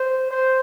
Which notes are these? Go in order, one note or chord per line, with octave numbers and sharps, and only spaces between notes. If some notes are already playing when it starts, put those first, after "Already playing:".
Already playing: C5
C5